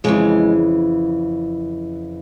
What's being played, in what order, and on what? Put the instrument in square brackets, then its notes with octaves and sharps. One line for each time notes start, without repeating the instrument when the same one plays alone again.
[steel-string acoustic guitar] F2 C#3 E3 G#3